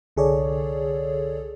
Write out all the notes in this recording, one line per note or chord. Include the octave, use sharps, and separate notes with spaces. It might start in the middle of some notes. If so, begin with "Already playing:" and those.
C2 D3 G#4 A4 C#5 D5